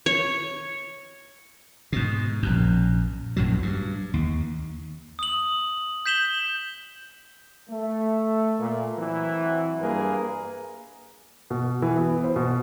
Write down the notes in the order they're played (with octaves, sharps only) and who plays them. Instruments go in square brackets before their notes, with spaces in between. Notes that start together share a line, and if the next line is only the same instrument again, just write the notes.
[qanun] C#5
[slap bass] G#2 B2
A#1 F#2
A#1 F#2 A2 F#3
G2
D#2
[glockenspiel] D#6 F#7
G6 B6 E7 F#7 G7
[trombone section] A3
A#2 A#3
E3 F#3 C4 E4
G2 A#3 G#4 A#4 B4
[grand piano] B2
E3
B3
C5
B2